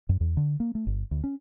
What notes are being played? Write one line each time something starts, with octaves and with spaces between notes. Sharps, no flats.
F#2
E2
D3
A#3
A3
G1
D2
C#4